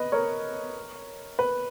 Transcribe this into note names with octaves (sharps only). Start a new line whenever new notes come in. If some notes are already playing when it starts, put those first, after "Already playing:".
Already playing: B4 D#5
A#4 C#5
B4